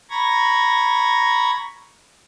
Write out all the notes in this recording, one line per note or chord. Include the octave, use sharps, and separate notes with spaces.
A#5 B5 C#6 G#6 A#6